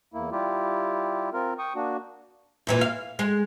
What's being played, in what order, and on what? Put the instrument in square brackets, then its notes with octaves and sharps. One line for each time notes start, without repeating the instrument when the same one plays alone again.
[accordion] E2 A#3 E4
G3 E4 F4 G4
C4 F4 A#4
G5 C#6 D#6
A#3 D4 F#4
[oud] E2 A#2 E3
F5
G#3